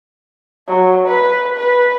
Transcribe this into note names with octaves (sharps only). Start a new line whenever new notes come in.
F#3
B4
B4